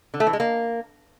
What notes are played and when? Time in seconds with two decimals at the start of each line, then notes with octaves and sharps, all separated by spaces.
0.14 D3
0.20 A3
0.27 E3
0.33 G#3
0.40 A#3